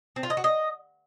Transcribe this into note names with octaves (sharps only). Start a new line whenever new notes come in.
C4
F4
D#5
F#4
D#5